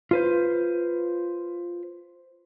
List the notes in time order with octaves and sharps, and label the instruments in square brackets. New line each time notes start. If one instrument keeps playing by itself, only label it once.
[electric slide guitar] F4 B4 C5